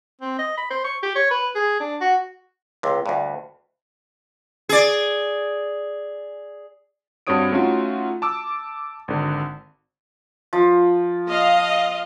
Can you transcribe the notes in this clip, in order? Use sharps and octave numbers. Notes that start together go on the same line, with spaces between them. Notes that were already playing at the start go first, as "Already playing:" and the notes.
C4
D#5
B5
C5
C#6
G4
C#5
B4
G#4
D4
F#4
C#2 C3
D2 G2
G#4 D5
G2 C4 F#4 C#5 D#6 D7
A3 C#4 D#4 F4 F#4
A5 D6 E6
G#1 D3
F3
D#5 F5